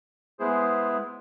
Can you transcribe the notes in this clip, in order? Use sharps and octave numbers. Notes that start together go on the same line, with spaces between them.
G#3 B3 E4 G#4 C5